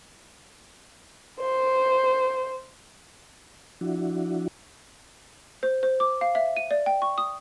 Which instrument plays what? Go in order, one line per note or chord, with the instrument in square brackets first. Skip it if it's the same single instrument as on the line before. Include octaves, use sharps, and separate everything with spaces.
[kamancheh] C5
[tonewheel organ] F3 D4 E4 F#4
[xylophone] C5
C5
D6
F5
E5
D#7
D5
G5
C#6
D#6